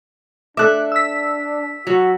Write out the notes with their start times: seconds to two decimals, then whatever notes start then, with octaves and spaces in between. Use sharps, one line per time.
0.57 D4 A4 E5 D6 F#6
0.92 E6 B6
1.87 F#3 F#4